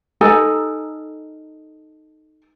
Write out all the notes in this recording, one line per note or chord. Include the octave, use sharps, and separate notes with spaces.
D#4 A4 A#4 G#5